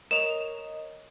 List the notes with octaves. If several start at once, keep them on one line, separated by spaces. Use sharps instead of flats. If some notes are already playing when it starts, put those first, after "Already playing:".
A#4 C#5 D#5 E7 F7